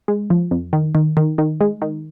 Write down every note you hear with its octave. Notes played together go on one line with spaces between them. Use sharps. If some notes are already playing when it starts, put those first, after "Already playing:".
G#3
F3
F2
D#3
D#3
D#3
D#3
G#3
D#3